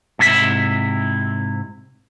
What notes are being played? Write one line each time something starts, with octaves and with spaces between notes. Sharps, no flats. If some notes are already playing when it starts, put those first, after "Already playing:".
G#2 C3 E4 G4 E5